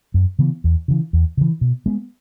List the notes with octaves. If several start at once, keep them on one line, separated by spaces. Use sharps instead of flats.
F#2
C#3 E3 B3
E2
C#3 E3
E2
C#3 E3
B2
G#3 B3